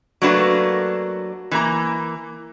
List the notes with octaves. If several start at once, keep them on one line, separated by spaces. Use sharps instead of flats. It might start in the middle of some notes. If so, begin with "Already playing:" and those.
F#3 A3 A#3 D4 F#4 B4
E3 A#3 A#5